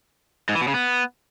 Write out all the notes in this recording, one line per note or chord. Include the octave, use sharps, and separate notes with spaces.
G#2
E3
B2
C#3
B3